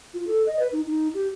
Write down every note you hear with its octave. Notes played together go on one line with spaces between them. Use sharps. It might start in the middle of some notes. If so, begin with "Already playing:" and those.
F4
A4
D#5
B4
D#4
D#4
G4